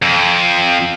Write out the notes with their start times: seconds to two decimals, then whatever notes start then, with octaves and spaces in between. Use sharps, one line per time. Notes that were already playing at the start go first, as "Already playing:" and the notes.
0.02 F2